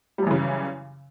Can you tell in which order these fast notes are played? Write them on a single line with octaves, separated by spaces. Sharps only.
G3 F#2 E3 C#3